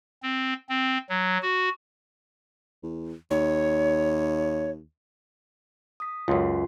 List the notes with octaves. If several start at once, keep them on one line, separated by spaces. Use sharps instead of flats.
C4
C4
F#3
F#4
E2
D#2 C#5
D#6 B6
C#2 F#2 F4 C6 C7